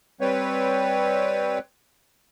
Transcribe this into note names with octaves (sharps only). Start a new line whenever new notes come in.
G3 C4 B4 C#5